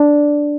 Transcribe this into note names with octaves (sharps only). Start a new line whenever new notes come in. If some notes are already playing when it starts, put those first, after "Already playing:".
Already playing: D4